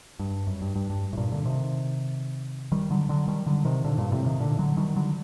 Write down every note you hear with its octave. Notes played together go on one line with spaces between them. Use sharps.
G2
F#2
G2
G2
G2
A2
G2 A#2
A#2 D3
C3 D#3
D#3 G3
D3 F#3
D3 F#3
D#3 G3
D3 F#3
C3 D#3
A#2 D3
G2 A#2
A2 C3
C3 D#3
A#2 D3
D3 F#3
D#3 G3
D3 F#3